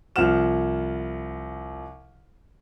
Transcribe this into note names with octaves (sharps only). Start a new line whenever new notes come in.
C2 F3 C5 F#5 F6 E7